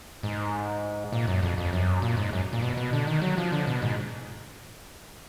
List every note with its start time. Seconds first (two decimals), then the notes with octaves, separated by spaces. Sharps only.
0.23 G#2
1.12 A#2
1.27 F#2
1.43 F2
1.58 F2
1.73 F#2
2.02 A#2
2.17 G#2
2.33 F#2
2.53 A#2
2.62 B2
2.77 B2
2.93 D3
3.07 D#3
3.22 F#3
3.38 F3
3.52 D3
3.67 B2
3.82 G#2